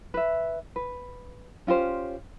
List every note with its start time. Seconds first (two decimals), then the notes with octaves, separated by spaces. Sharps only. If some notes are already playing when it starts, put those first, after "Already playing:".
0.14 B4 E5
0.76 B4
1.67 C#4 F4 G4 C5